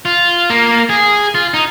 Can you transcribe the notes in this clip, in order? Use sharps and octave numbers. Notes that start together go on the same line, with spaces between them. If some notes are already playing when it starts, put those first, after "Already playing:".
F4
A#3
G#4
F4
D#4